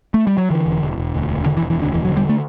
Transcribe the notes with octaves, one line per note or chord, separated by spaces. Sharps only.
A3
G3
F#3
D3 E3
E1
E1
E1
D2
E1
E1 D3
E3
E1
E3
D2 D3
E1 E3
F#3
D3
G3
A3